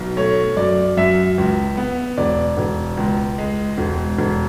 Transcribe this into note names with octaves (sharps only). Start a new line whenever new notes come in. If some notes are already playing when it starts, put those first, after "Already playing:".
Already playing: B1
A3 C#5
F#2 D5
F#2 E5
C#2
B3
E1 D5
E1
C#2
G#3
E1
E1